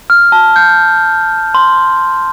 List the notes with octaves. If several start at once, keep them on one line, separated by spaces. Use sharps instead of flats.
F6
A5
G6
C6